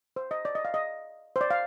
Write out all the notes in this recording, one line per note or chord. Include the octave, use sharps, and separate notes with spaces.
C5
D#5
D5
D#5
F5
D#5
C5
D5
F5